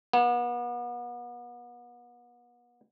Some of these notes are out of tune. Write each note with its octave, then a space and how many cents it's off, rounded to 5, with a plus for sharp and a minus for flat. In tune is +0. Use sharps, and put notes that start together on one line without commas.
B3 -35